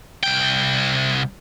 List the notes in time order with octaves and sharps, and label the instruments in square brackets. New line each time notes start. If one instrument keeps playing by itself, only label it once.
[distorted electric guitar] C2 G5